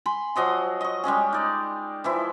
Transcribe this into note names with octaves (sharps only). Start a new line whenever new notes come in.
G#5 B5 C6
F3 F#3 D#5 C6
D#5 C#6
G3 G#3 C#4 G#4
D#4 D5
E3 F3 E4